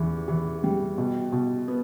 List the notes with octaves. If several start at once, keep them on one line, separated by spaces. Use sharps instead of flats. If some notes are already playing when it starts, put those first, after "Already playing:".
Already playing: E2 E3
E3
G3
B2
B2
B3